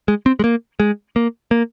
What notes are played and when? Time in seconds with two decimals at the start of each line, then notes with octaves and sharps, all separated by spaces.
0.08 G#3
0.26 C4
0.39 G#3
0.44 A#3
0.80 G#3
1.16 A#3
1.51 A#3